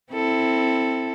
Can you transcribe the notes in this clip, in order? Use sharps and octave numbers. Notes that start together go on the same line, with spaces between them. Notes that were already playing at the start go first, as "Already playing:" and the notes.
C4 E4 A4